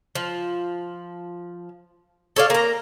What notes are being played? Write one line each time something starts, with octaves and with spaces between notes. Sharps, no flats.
F3
A4 C#5 D5 F5
A#3 A#5